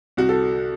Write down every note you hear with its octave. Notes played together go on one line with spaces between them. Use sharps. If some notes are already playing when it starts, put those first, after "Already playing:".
C2 F#4
A4